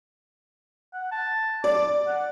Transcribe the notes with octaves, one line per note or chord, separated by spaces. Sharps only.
F#5
A5
D5 D6
F#5